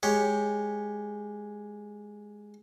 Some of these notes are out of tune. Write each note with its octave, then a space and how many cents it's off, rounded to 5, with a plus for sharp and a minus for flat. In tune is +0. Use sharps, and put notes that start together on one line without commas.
G#3 +0 G4 +0 C#5 +0